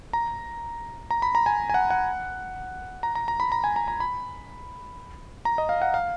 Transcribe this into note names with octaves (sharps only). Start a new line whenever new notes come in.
A#5
A#5
B5
A#5
G#5
G#5
F#5
F#5
A#5
A#5
A#5
B5
A#5
G#5
A#5
A#5
B5
A#5
D#5
F5
F#5
F5